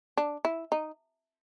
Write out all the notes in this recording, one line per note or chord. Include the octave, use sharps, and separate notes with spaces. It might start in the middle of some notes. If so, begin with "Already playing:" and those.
D4
E4
D#4